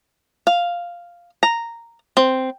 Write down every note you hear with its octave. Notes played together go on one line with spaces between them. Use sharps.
F5
A#5
C4